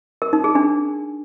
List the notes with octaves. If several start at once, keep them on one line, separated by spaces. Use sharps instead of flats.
A#4
D#4
G#4
D4